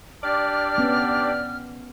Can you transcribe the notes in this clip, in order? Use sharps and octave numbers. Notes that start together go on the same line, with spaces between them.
D4 G4 D5 F6
B3 C#4